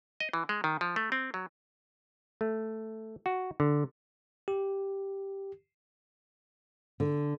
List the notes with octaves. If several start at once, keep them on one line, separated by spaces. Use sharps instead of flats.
D#5
E3
G#3
D#3
F3
A3
C4
F#3
A3
F#4
D3
G4
D3